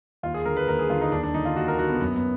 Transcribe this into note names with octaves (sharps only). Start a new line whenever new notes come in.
D#2 F4
G#4
D3 A#4
B4
D#2 A#4
G#4
D3 F4
D#4
D#2 D4
D4
D3 D#4
F4
D#2 F#4
A#4
D3 F#4
B3
F#2 B3
B3